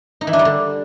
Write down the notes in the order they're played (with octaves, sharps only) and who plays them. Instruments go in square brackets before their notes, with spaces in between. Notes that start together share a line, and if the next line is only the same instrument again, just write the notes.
[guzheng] D#4
E3
D4
G3
D3